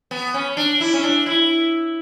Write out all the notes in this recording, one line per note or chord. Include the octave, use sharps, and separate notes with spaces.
B3
C#4
D4
E4
C#4
D4
E4